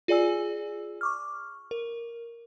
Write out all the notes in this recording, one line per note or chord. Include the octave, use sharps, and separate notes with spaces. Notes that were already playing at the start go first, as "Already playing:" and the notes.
F4 G#4 D5 G#5 E6
C#6 D6 F6
A#4